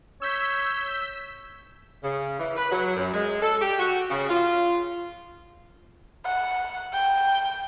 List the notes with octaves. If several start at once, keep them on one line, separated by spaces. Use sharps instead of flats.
C#5 E6 G6 B6
C#3
E3
B4
F#3
F#2
G#3
A4
G4
F#4
C#3
F4
F#5
G5